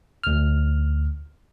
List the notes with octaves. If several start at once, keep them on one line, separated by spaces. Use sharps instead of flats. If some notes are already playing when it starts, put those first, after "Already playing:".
D2 F6